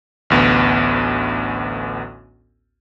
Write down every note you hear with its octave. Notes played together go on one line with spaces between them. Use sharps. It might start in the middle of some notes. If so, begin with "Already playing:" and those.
A1 D2 B3